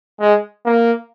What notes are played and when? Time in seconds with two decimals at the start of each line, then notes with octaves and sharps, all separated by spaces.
0.21 G#3
0.65 A#3